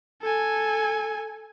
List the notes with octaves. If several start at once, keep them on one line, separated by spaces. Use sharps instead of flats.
A4 G#5